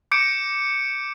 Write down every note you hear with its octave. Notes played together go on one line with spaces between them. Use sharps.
D6 G6 C#7 D7